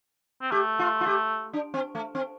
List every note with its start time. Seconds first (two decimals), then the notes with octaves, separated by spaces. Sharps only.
0.42 C4
0.51 A3 G4
0.79 F4
1.01 F4
1.06 G4
1.53 D4
1.74 C4
1.95 A3
2.15 C4